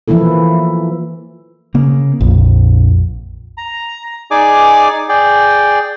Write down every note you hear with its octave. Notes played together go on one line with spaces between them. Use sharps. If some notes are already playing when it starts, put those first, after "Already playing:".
E3 F3 A#3 E4 A4
C#3 A#3
A#1 F2
A#5
D#4 G#4 D5 G#5 D6
G#4 D5 G5